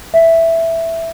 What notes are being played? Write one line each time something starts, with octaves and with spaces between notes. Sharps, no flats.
E5